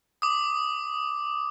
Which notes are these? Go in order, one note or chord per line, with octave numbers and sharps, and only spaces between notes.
D6 D#6